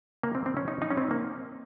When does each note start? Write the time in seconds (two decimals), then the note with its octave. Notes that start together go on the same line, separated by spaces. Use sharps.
0.23 A#3
0.35 C4
0.46 C4
0.57 C#4
0.68 D#4
0.82 D#4
0.90 C#4
0.97 C4
1.11 A#3